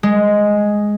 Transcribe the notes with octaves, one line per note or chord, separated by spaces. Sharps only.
G#3